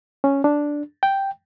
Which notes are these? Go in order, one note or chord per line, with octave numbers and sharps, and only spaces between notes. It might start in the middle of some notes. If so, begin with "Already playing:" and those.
C#4
D4
G5